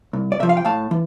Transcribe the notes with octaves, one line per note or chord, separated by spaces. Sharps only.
C2
D5
C3 F3 E5
F5
G5
A2 F5 A5
E3